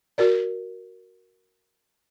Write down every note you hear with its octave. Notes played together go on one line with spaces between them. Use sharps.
F#4 A#4 D5